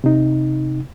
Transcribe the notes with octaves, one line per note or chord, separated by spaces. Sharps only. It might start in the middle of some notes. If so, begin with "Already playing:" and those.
C3 D#4